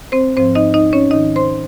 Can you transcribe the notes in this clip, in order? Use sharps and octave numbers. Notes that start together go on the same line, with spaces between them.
C4 C5
G#2 F3 C4 C5
D#4 D#5
D#4 D#5
C#4 C#5
G#2 D#3 D#4 D#5
C5 C6